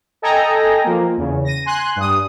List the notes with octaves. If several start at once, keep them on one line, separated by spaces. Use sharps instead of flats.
A4 D#5 G5 G#5 A#5
F3 A#3
E2 C#3
A#6 D#7
G#5 C6 F#6
G2 D#6